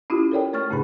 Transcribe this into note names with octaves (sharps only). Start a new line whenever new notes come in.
C#4 E4 F4 G4
A4 A#4 C#5 D5 G5
A3 C#5 C#6 F6 A6
F#2 A2 C#3 D4 G#4 B5